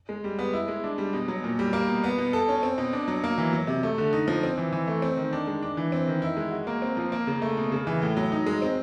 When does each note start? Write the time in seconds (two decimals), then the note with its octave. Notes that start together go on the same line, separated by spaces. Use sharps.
0.09 G#3
0.24 G3
0.39 B3
0.53 E4
0.68 G#3
0.84 D4
0.98 G3
1.13 B2
1.28 F#3
1.44 A#2
1.59 G3
1.73 A#3
1.88 B2
2.04 B3
2.18 B2
2.33 A4
2.49 C#4
2.63 C4
2.78 B2
2.93 D4
3.08 F#3
3.24 A#3
3.38 E3
3.53 F#3
3.67 C3
3.83 A3
3.98 D3
4.13 D#4
4.28 F3
4.43 C4
4.58 E3
4.72 E3
4.88 A3
5.02 C4
5.17 D#3
5.33 D4
5.47 G#3
5.63 D4
5.77 E3
5.92 C4
6.07 D#3
6.22 E4
6.37 G#3
6.52 F#4
6.67 A#3
6.82 C4
6.97 F3
7.12 A#3
7.27 C#3
7.42 A3
7.57 B2
7.72 C#3
7.87 E3
8.02 A2
8.17 F#3
8.32 D#4
8.46 G#3
8.62 C4